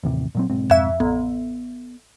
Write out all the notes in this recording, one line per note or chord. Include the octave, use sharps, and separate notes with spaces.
A1 D#2 C3
A#2 F#3 C4
B1 G#2 C4
F2 E5
A1 B3